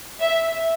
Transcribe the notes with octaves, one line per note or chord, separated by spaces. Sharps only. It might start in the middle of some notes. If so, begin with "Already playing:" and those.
E5